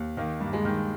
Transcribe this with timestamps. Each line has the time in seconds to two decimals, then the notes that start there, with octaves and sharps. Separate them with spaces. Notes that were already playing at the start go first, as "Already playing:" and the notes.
Already playing: D#2
0.17 D#3 A#3
0.40 G2
0.53 G#3
0.65 D#3